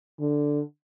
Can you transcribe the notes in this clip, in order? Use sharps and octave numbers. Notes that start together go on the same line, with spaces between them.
D3